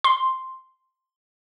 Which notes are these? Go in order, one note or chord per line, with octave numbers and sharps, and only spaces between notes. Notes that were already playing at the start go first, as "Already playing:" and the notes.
C6